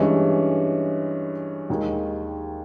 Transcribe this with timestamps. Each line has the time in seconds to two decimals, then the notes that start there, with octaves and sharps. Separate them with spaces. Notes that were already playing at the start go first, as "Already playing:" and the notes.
Already playing: G2 E3 G#3 C#4
1.70 D#2 D#3 G#3